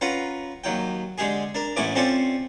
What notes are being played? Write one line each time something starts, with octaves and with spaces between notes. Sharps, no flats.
C#4 F4 B4 F#5 A#5
D#2 F#3 G5
D3 G#3 G4 G#4
D4 A#4
A1 A2 E3 B3 C#4 D6
C4 C#4 F4 A4 C5 D5